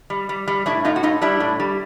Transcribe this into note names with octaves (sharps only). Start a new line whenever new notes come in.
G3
G3
G3
A2 D4 E4
A2 D#4 F4
F#4
A2 D#4 F4
G3 D4 E4
A2
G3